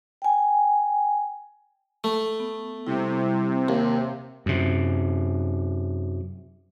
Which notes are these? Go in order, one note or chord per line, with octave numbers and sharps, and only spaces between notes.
G5 G#5
A3
B3
C3 G3 E4
D#2 F5
F#2 C3